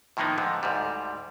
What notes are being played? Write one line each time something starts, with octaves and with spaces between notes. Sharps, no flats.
A2 D#3 F3 A#3 B3 D#4
G#2 D3 F3
D2 G#2 G3